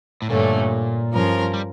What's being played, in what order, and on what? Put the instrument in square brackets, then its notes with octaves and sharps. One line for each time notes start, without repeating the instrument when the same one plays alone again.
[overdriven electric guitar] A2
[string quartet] G2 D3 A3 C#4 [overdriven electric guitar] A#2
[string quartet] G2 F3 C#4 F4 A#4
[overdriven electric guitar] G3